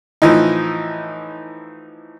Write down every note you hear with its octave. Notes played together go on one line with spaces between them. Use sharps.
A2 E3 F3 D#4